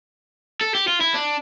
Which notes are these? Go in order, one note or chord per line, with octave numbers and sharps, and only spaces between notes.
A4
G4
F4
E4
D4